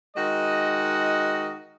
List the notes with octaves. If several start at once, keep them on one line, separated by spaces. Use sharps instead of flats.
D#3 G#3 F#4 D#5